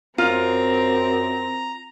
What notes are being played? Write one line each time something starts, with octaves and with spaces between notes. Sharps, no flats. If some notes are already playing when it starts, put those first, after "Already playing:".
F#2 C4 F4 A#5